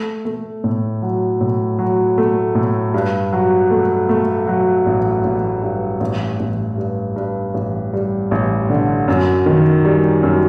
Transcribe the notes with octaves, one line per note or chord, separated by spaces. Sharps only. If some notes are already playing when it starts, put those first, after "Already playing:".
Already playing: A3
A3
A2
F#3
A2
F#3
A3
A2
G2
F#3
A3
A3
F#3
A1
A1
G2
A1
A1
G2
G2
A1
G3
A1
D3
F#2
D#3
G3
F#2